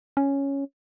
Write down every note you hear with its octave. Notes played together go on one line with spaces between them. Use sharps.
C#4